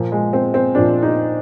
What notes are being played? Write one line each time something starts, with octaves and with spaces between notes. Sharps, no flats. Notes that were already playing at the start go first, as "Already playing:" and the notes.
Already playing: A#2 F3
G#3
C4
C4
A#2 F3 D4
D#4